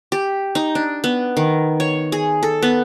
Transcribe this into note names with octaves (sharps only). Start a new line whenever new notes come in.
G4
D#4
D4
B3
D#3
C#5
G#4
A4
B3